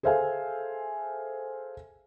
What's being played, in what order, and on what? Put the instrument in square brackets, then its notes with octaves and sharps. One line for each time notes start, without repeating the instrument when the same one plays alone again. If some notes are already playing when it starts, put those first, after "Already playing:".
[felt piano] G#4 A4 C5 E5 F5 G#5